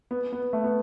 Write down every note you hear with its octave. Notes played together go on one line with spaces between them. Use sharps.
B3
B3
A3
B3